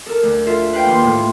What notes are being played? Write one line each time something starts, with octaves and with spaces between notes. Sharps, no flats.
A4 A#4
D2
F4 A4 E5
B4 F5 G5
D#2 C6
A2